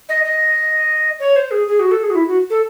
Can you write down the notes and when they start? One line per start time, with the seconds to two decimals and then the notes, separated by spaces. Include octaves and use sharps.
0.09 D#5
0.25 D#5
1.20 C#5
1.36 C5
1.51 G#4
1.67 G#4
1.80 F#4
1.91 A4
2.03 G#4
2.10 F#4
2.15 E4
2.27 F#4
2.50 A4